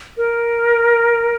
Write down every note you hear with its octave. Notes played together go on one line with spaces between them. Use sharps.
A#4